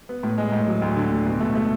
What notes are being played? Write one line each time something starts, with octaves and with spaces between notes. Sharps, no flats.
B3
A2
G#3
A2
F#3
D2
D3
D2
B2
A3
A3